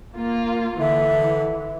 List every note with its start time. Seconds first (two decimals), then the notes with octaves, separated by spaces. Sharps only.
0.15 A#3 F4
0.80 D3 E3 E5